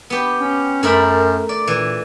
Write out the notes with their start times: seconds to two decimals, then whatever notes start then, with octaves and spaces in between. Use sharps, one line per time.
0.10 B3 G4
0.40 C#4
0.83 F#2 A3 A#4 B5
1.49 D5
1.67 A#2 E3